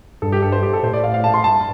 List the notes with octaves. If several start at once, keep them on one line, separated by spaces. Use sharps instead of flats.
G2 A4
G4
A4
C5
G4
A4
A2 C5
D5
F5
F5
A5
C6
G2 A5